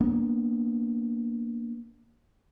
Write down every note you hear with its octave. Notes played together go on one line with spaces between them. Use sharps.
A#3 B3 D4